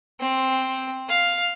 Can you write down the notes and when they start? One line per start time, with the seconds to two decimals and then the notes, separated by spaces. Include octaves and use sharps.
0.20 C4
1.09 F5